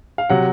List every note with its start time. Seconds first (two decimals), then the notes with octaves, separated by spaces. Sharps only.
0.18 F5
0.29 C3 F#3 F#5